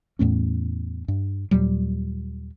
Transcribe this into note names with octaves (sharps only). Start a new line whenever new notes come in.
E2 A2 A3 C#4
G2
D#2 A#2 F#3 G3